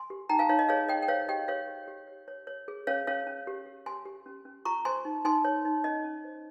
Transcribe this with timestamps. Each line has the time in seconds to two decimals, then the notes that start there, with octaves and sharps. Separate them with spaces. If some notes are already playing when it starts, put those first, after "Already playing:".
Already playing: G#5 C6
0.10 G4
0.29 D#4 G5 A#5
0.39 F5 G#5
0.49 D#4 C#5 F5
0.59 D#5
0.69 G#4 C#5 F5
0.89 C#5 D#5 G5
1.02 G5
1.08 C5 C#5 F5
1.28 G4 D#5 G5
1.48 G4 C#5 F5
1.68 G4
1.88 G4
2.08 C#5
2.28 C#5
2.47 C#5
2.68 G#4
2.87 C#4 C#5 F5
3.07 C#4 C#5 F5
3.27 C#4
3.47 G4
3.66 G4
3.86 G4 G#5 C6
4.06 G4
4.26 C#4
4.45 C#4
4.65 F4 A#5 C#6
4.85 C5 G#5 C6
5.05 D#4
5.25 D#4 G#5 C6
5.45 C#5
5.65 D#4
5.84 C#4 D#5
6.04 C#4
6.24 C5